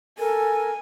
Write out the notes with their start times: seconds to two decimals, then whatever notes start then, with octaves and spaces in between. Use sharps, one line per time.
0.19 A4 A#4 G#5